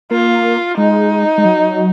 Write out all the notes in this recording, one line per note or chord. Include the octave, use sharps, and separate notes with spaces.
A#3 F4
G#3 D#4
G#3
F#3